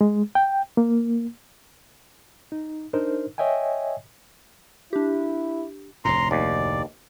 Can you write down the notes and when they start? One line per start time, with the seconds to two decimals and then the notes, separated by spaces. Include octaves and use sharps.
0.01 G#3
0.35 G5
0.77 A#3
2.52 D#4
2.93 D4 D#4 A#4 C5
3.38 C#5 D#5 E5 G5 G#5
4.93 D4 E4 G4
6.05 F1 D2 A2 A#5 C6
6.31 D#2 D5